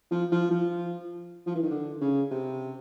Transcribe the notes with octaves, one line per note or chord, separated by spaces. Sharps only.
F3
F3
F3
F3
E3
D#3
D3
C#3
C3